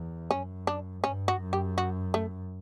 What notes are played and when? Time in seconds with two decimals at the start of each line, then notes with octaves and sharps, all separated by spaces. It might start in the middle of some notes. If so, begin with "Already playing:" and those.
Already playing: E2
0.30 F#2 C#4
0.67 D4
1.04 G2 C#4
1.28 F#4
1.41 F#2
1.53 G4
1.78 F#4
2.14 A3